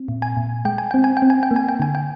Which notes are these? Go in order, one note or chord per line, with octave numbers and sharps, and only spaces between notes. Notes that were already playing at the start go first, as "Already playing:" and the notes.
Already playing: C4
A#2
G#5
A#2
G#3 G5
G#5
C4 G5
G#5
G5
C4
G#5
G5
A#3
G#5
G5
D3 G#5
G5